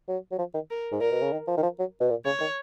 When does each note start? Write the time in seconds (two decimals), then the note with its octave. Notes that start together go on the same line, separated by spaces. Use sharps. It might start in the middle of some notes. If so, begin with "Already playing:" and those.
0.08 F#3
0.32 F#3
0.39 F3
0.54 D#3
0.71 A#4
0.92 G#2
1.01 A#2 A#4
1.12 B2
1.21 C#3
1.32 D#3
1.48 F3
1.57 D#3
1.63 F3
1.79 F#3
2.00 B2
2.10 A#2
2.25 C#3 C#5
2.40 D#3